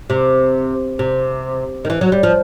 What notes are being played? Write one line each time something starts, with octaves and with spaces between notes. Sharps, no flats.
C3
C3
D#3
E3
F#3
G3
F3